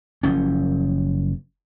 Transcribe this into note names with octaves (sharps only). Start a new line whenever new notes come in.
F#1 F3 C#4